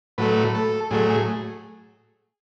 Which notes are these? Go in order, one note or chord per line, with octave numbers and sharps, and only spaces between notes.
A2 F#3 A3 B4
A4
A2 F#3 A3 G#4
G#4